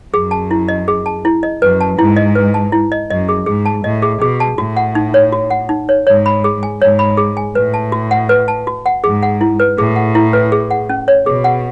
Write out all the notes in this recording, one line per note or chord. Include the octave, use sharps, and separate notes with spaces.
F#2 G#4
A5
E4
D#5
G#4
A5
E4
D#5
F#2 B4
A5
G#2 E4
D#5
B4
A5
E4
D#5
F#2 D#5
G#4
G#2 G#4
A5
A2 D#5
G#4
B2 G#4
A5
A2 F#4
F#5
D#4
C#5
F#4
F#5
D#4
C#5
G#2 C#5
B5
G#4
G#5
G#2 C#5
B5
G#4
G#5
A2 B4
A5
F#4
F#5
B4
A5
F#4
F#5
G#2 G#4
F#5
E4
B4
A2 G#4
F#5
E4
B4
G#4
F#5
C#4
C#5
B2 G#4
F#5